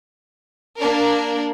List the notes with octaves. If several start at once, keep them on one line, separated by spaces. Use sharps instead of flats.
A#3 D4 A#4